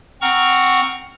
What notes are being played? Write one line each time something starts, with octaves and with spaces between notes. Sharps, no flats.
C4 F#5 A#5 C#6 F6